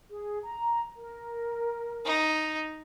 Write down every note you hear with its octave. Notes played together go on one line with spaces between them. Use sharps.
G#4
A#5
A#4
D#4